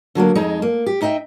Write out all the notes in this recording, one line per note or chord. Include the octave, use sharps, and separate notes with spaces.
D3 F#3 G3 A#3
F2 G#3 D#4
A#3
G4
D#4 D#5 E5 G5